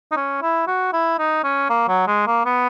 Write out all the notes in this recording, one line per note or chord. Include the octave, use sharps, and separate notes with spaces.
D#4
C#4
E4
F#4
E4
D#4
C#4
A#3
F#3
G#3
A#3
B3